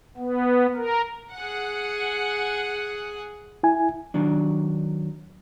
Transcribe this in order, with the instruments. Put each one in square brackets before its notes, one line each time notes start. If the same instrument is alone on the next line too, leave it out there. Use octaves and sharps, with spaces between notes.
[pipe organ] B3
A#4
[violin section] G#4 F#5
[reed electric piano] E4 G#5
[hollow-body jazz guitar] D#3 F#3 D4